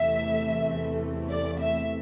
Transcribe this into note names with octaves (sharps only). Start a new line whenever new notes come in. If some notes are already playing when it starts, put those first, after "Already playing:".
Already playing: E2 C3 E3 A3 E5
D5
E5